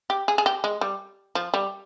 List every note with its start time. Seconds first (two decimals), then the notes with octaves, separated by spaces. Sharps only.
0.10 G4
0.28 G#4
0.38 G#4
0.46 G4
0.64 G#3
0.81 G3
1.35 F3
1.54 G3